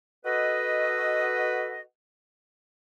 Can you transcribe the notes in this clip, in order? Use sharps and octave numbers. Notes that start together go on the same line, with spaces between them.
F#4 A4 B4 D#5